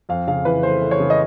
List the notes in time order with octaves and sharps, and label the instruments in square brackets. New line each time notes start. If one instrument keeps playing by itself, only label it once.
[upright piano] F2 F5
C#3 F5
E3 B4
A3 C5
A3
C#5
C#3
D#5